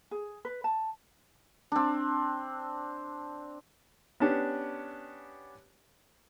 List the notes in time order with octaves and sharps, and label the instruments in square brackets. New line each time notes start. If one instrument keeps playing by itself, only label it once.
[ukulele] G#4
B4
A5
[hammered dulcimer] C4 D4
[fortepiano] B3 C#4 D4 G4